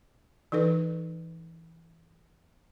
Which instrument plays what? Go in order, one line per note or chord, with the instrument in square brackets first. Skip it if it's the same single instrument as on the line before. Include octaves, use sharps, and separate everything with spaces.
[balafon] E3 D#4 A4 B4